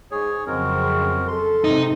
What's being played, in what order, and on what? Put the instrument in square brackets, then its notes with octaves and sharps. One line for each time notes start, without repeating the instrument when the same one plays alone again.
[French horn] G#2 [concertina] G#4 C#5
[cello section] F2 C#3 F#3 [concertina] G#3 F#4 A#4 [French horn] C4
[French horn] A4 [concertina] C6
[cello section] G#2 C3 [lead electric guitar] D#4